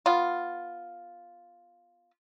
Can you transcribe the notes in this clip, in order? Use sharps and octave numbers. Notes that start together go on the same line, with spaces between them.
B3 F4